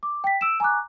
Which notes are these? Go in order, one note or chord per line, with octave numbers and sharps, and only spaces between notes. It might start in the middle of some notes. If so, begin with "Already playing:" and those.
D6
G5 B6
E6 D7 E7
G#5 A#5 C#6 D6 F#6